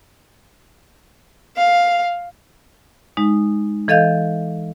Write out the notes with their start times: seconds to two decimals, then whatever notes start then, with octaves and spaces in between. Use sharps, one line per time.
1.57 F5
3.17 G#3 D#4
3.88 E3 A4 D#5 F5 G6